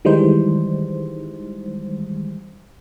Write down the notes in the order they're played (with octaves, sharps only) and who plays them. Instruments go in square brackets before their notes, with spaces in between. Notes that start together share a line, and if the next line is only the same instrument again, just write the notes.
[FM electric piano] D#3 E3 G3 G#3 D#4 C5